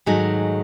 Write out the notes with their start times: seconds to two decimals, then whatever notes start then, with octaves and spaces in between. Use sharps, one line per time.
0.06 G#2 D#3 F#3 A3 D#4 G#4